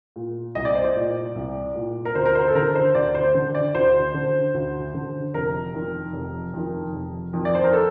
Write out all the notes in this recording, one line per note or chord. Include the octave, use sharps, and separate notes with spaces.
A#2
C2 D#5
D5
C5
D5
A#2
C2
A#2
A#4
D2 C5
A#4
C5
A4
D3 A#4
C5
D2 D5
C5
D3
D5
D2 C5
D3
D2
D3
F1 A#4
F2 D#3
F1
F2 D#3
F1
F2 D#3
D5
C5
A#4
A4